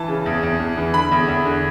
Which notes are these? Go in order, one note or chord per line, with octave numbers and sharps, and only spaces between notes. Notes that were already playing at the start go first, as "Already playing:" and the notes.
Already playing: E3 A5
C#3
E2
E2
E2
E3
D3 B5
E2
E2
D3